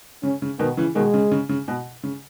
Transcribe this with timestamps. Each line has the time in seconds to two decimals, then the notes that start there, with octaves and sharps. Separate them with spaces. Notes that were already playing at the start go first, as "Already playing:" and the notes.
0.23 C#3 C#4
0.42 C#3
0.59 B2 D#3 B3
0.77 C#3 E3
0.95 B2 D#3 G#3
1.14 C#3
1.31 C#3
1.49 C#3
1.68 B2
2.03 C#3